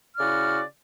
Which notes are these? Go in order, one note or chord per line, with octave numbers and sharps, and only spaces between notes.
C#3 E4 F#4 D5 F6